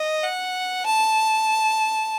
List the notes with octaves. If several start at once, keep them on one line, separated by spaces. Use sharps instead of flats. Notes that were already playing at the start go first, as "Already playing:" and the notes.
Already playing: D#5
F#5
A5